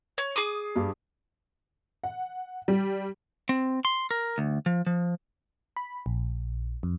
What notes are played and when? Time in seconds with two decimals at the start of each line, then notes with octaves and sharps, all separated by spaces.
0.18 C#5
0.36 G#4 D6 D#6
0.75 G2 G3
2.04 F#5
2.68 G3
3.49 C4
3.85 C6
4.11 A#4
4.38 D2
4.66 F3
4.86 F3
5.77 B5
6.06 A#1
6.83 F2